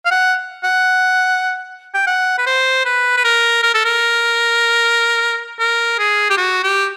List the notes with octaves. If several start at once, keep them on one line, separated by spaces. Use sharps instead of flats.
F5
F#5
F#5
G5
F#5
B4
C5
B4
B4
A#4
A#4
A4
A#4
A#4
G#4
G4
F#4
G4